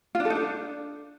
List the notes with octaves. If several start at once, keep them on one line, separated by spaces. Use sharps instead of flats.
F4
D4
A4
D#4
D4